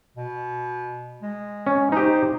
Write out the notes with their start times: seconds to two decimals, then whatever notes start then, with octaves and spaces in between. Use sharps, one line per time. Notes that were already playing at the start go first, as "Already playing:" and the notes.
0.17 B2
1.22 G#3
1.67 C#4
1.92 D#4 G4 C5